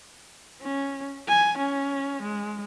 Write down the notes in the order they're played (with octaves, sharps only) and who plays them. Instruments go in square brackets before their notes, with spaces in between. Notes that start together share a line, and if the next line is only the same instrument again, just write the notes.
[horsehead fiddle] C#4
G#5
C#4
G#3